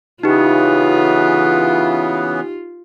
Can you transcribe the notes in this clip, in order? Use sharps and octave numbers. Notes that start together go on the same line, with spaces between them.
C#3 E3 B3 D#4 F4 G4